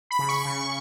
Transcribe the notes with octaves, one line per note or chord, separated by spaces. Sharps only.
B5
C#3
C#6
C#3